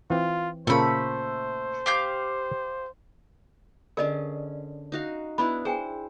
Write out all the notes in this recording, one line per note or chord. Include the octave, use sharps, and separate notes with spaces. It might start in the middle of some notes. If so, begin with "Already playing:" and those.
E3 C4 F4
A#2 C#3 A3 A#3 C5 B5
G4 F5 G6
D3 C#4 G#4 A#4 D5 D#5
D#4 F#4 F5
B3 D4 E4 B5
G#4 C5 G5 G#5